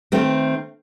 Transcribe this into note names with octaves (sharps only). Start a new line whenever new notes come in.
D#3 A3 C4